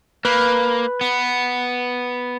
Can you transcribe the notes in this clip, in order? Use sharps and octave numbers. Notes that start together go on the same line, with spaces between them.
A#3 B4 B5
B3